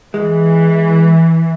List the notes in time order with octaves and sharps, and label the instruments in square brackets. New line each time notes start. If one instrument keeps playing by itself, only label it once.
[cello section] E3 [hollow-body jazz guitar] G#3